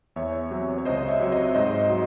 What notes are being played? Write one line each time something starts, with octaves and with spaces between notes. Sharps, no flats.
E2 C#5 E5
C3 F#3
C#5
C#2 C5 D#5
C#5 E5
C3 F#3
C5 D#5
G#2 C5 D#5
F#3